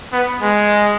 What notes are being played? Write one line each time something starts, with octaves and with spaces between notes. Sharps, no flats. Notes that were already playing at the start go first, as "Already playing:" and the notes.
B3
G#3